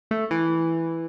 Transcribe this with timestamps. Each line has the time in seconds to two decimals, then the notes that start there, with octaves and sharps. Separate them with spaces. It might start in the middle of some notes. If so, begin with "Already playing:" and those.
0.11 A3
0.31 E3